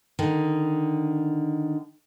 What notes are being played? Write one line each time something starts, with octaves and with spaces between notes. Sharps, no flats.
D3 D#3